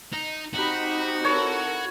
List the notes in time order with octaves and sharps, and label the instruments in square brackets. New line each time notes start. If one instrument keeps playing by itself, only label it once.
[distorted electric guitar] D#4
[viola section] C4 D#4 G4 [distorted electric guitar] F#4 [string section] A#5 B5
[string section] E4 A4 A#4 [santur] C#5